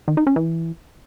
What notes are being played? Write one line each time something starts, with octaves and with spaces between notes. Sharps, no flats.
D#3
D#4
C#4
E3